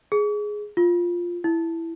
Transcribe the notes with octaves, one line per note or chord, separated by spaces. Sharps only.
G#4
F4
E4